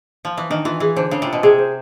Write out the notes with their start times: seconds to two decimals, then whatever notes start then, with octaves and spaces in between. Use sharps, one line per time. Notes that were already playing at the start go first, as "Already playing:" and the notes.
0.25 F3
0.37 E3
0.50 D#3 D4
0.65 E3 F4
0.80 E3 G#4
0.96 D3 C5
1.11 C#3 D4
1.22 C3 F4
1.33 B2
1.43 C3 G#4
1.58 C5